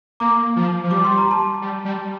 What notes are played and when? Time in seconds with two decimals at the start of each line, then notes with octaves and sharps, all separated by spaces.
0.20 A#3 A#5 D6
0.56 F3
0.84 F3
0.91 G3 D6
1.04 C6
1.18 A#5
1.31 A5 C6
1.62 G3
1.85 G3